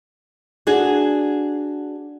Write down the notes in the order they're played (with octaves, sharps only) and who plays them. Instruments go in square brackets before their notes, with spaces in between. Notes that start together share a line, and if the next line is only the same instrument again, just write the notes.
[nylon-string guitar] D4 F#4 G#4